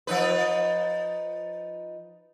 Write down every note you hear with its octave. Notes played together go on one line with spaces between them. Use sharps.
F3 D#4 B4